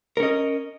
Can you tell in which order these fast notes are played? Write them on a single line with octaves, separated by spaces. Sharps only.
A#4 C#4 D#5